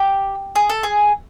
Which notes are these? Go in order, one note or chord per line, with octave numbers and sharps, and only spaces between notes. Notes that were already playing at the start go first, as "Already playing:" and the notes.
Already playing: G4
G#4
A4
G#4